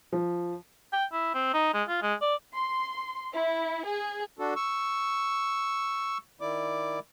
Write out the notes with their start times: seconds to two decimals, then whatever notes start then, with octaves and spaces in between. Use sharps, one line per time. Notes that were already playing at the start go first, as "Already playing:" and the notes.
0.12 F3
0.93 G5
1.12 E4
1.34 C4
1.54 D#4
1.74 G#3
1.88 F4
2.02 G#3
2.22 D5
2.54 C6
3.33 E4
3.86 G#4
4.39 D4 F#4 A4
4.56 C#6 E6
6.41 D#3 E4 D5 D6